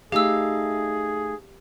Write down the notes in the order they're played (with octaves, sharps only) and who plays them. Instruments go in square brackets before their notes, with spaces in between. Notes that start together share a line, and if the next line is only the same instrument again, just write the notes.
[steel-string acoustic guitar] A3 D#4 F5 [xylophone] G4 E6 [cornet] G#4